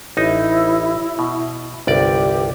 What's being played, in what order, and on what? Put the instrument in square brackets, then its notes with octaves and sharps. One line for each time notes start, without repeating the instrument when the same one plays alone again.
[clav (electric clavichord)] A1 D#4 [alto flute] E4
[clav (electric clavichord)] B2
[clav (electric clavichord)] G1 C2 D5 [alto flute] G4